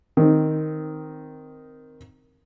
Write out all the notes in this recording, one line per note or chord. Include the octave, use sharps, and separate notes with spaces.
D#3 C4